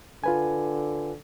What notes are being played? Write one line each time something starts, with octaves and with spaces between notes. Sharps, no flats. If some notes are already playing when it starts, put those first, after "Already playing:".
D3 F4 B4 G#5